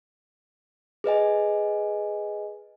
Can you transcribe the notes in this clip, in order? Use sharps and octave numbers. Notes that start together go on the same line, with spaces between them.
G#4 B4 D#5 G#5